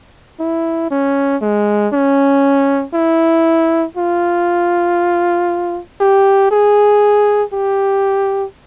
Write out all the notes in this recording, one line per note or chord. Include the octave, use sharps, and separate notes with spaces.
E4
C#4
G#3
C#4
E4
F4
G4
G#4
G4